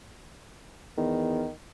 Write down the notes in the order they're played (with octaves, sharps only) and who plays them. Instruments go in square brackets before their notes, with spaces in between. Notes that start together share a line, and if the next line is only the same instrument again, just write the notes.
[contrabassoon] E2 [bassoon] D#3